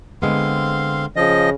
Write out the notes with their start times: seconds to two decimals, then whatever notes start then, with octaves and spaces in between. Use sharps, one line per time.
0.22 D3 G#3 B3 C4 F5 C6
1.16 C#3 F3 D#5